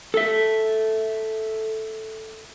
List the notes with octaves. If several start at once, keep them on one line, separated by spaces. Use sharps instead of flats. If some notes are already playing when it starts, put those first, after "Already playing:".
A4 E5